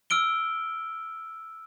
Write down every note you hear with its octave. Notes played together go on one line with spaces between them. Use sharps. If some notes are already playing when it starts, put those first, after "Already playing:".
E6 F6 D7 G7